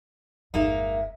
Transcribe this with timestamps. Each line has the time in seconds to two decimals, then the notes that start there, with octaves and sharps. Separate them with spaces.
0.54 G1 E2 G#3 A#3 D#4 E5